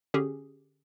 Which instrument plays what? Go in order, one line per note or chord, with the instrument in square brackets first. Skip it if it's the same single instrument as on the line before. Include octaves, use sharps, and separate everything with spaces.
[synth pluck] D3 C#4 G4 G#4